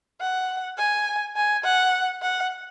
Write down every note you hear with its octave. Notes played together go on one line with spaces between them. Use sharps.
F#5
G#5
G#5
F#5
F#5